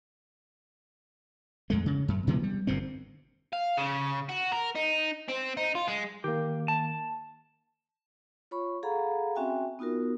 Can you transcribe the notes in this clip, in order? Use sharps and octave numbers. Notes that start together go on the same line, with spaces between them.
F2 G#3 A3
C#3
F#2
B2 E3 G#3 B3
G3
G1 G2 A#2 C4
F5
C#3
F#4
A#4
D#4
C4
D#4
F4
G#3
D#3 A#3 G4
A5
F4 C#5 B5 C#6
G#4 A4 F5 F#5 A#5 B5
C4 C#4 F#4 E5 G5 G#5
B3 D#4 F4 F#4 A#4